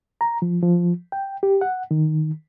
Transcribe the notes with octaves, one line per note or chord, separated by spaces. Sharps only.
A#5
F3
F3
G5
G4
F#5
D#3